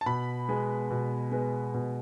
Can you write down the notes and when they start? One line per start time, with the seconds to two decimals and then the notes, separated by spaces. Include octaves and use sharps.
0.01 A5
0.06 B2 B5
0.49 G#3 B3
0.90 B2
1.32 G#3 B3
1.74 B2